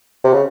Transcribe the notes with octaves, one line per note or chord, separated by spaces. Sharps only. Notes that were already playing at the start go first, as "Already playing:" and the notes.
C3
C#3